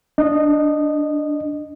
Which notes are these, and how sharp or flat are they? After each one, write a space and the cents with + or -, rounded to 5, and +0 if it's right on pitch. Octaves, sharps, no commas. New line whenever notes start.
D4 +0 D#5 -15